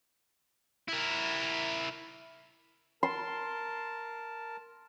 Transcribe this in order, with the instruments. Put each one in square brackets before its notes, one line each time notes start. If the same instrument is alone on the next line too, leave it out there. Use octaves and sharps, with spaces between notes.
[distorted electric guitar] E4 A#4
[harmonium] A#4 A5 [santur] C6